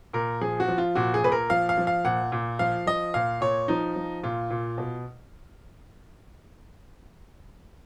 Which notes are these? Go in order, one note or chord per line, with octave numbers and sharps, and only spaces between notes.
A#2 A#4
F3 G#4
F#4
F3
F4
A#2 F#4
G#4
A#2 B4
A#4
F3 F5
F5
F3
F5
A#2 F#5
A#2
F3 F5
F3 D#5
A#2 F5
A#2 C#5
F3 D#4
F3
A#2 F4
A#2
B2